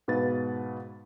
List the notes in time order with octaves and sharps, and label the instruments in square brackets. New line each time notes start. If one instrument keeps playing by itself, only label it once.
[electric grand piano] G#2 B2 B4 F5 A6